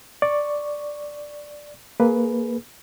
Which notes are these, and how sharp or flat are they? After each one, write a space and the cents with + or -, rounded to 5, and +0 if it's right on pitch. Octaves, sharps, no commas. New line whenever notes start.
D5 +0 C#6 +0
A#3 +0 G#4 +30 B4 +0